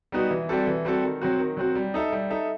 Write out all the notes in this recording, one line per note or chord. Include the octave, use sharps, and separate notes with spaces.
G3 B3 D#4 F#4
E3
G3 C4 F#4 A4
E3
G3 C4 F#4 A4
D#3
F#3 C4 F#4
D#3
F#3 C4 F#4
G3
D#4 A4 E5
G3
D#4 A4 E5